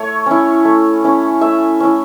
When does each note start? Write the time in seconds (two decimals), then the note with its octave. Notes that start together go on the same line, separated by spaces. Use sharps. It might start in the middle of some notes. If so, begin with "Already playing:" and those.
Already playing: A3 C#5
0.26 C#4 E4
0.65 A3
1.04 C#4 E4
1.41 A3 E5
1.80 C#4 E4